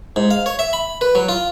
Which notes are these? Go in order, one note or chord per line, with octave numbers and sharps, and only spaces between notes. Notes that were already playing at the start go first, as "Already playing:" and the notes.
G#2
F5
C#5
E5
B5
B4
F#3
F4